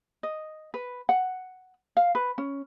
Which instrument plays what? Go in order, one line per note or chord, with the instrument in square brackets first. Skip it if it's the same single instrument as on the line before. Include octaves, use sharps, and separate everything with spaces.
[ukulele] D#5
B4
F#5
F5
B4
C#4